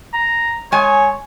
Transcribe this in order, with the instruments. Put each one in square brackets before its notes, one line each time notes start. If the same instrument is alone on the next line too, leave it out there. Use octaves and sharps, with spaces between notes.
[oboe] A#5
[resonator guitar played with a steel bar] G#3 G#5 [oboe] C#5